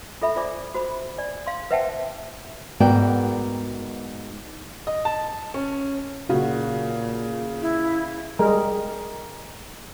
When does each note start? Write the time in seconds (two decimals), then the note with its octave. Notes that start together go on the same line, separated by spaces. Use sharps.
0.22 F4 A4 E5 B5
0.36 F4 C5 D5 G#5 D6
0.75 F#4 C5 B5
1.18 D5 G#5
1.47 F5 C6
1.71 B4 C5 E5 F#5 G5 A5
2.80 G#2 B3 F#4 A#4 D5 G5
4.87 D#5
5.05 A5
5.54 C#4
6.30 A#2 C#3 F#4
7.61 E4
8.39 G3 G#3 A#4